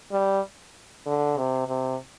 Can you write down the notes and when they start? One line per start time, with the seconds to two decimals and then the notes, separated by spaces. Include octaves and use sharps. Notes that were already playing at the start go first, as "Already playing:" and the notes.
0.12 G3
1.06 D3
1.37 C3
1.68 C3